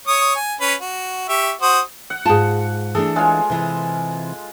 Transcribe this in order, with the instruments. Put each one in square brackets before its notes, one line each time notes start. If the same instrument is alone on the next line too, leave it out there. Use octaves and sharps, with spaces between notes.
[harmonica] C#5 D#6
G#5
C#4 B4
F#4
G4 E5 C#6
F#4 C5 D#6
[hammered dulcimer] F#5
[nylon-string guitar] G#2 F4 [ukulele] G#4 G5 A5
[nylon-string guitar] E3 A3 D4 [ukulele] G#4 [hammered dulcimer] A4
[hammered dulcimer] G#3 F4 [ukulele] B4 C#5
[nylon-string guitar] C3 E3